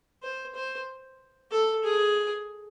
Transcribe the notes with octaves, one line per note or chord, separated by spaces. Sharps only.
C5
C5
A4
G#4